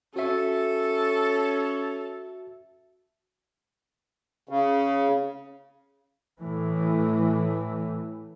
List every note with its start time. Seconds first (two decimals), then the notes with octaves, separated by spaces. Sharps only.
0.16 C#4 F#4 A4 E5
4.49 C#3
6.38 A2 E3